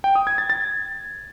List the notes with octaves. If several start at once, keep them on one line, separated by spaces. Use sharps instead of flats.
G5
D#6
G#6
A6
A6